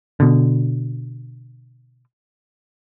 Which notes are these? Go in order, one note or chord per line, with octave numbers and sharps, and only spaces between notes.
B2 D3